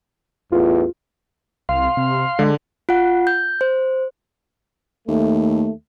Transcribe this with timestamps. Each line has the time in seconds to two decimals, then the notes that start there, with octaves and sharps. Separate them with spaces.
0.52 A1 E2 F4
1.69 C2 F5 C6
1.97 C3
2.39 D3 G#3
2.89 F4 F#5
3.27 G6
3.61 C5
5.08 D#2 A3